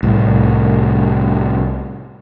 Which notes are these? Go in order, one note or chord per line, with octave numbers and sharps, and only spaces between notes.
C2 A2